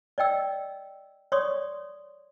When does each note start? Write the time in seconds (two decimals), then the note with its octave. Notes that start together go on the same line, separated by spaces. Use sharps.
0.18 D5 D#5 G5 E6
1.32 C#5 D5 C6 C#6 D#6